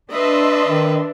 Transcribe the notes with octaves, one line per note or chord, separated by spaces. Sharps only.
D4 B4 D#5 E5 C6
D#3